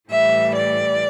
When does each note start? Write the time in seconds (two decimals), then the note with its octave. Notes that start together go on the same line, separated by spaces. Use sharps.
0.11 A2 E3 G3 E5
0.55 D5